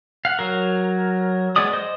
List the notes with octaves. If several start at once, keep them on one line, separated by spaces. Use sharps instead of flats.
F5 F#5
F#3 A#4
G#3 B3 D5 D#6
C5 D#5